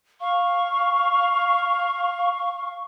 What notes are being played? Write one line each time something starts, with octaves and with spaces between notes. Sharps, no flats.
F5 C#6